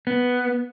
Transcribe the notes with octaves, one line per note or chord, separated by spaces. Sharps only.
B3